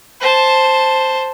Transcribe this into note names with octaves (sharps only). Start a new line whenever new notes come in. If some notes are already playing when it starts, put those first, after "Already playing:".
C5 A5